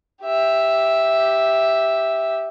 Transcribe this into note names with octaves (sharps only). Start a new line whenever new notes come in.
G4 E5